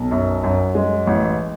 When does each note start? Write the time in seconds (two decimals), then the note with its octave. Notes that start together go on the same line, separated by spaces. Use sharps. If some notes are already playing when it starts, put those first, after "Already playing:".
Already playing: B1
0.11 F#2
0.43 F#2
0.75 G#3
1.07 A1